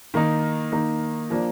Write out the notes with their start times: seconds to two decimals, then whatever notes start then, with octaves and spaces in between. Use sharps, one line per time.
0.14 D#3 A#3 D#4
0.72 D#3 A#3 D#4
1.30 F3 A#3 D4